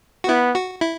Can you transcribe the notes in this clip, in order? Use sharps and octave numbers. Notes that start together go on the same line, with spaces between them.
F#4
B3 E4
F#4
E4